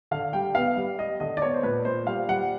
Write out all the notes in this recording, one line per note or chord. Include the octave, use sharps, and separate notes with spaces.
D3 F5
G3 G5
B3 F5
G3
G3 D#5
D3 D#5
D5
B3 C#5
C5
A#2 B4
A#2 C5
G3 F5
G3 F#5